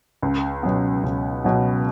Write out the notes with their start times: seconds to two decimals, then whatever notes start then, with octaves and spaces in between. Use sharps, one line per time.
0.22 C#2
0.63 B2 F#3 B3
1.03 C#2
1.44 B2 F#3 B3